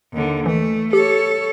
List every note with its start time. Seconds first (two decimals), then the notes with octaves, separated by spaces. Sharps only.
0.13 D#2 D3
0.46 E3 A3
0.93 G4 A4 C#5